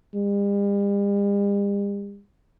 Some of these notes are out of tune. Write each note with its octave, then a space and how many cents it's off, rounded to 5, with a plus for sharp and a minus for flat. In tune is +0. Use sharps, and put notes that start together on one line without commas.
G3 +45